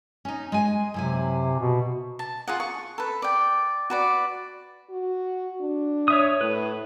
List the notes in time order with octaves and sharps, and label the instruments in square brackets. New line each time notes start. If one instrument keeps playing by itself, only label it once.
[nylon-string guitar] C#4 D#4
G#3 G#5
[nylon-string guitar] F#2 E4 G#5 [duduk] C3
[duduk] B2
[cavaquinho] A5
F4 G#4 F#5
C#6
A4 B4
D5 G5
F#4 B4 D5
[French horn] F#4
D4
[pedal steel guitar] C#5 E5 D#6
[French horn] A2 [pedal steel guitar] B4